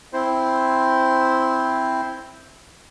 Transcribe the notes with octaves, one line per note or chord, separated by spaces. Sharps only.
C4 E4 C5